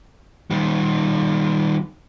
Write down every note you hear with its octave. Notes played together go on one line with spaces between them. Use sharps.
D#3 G3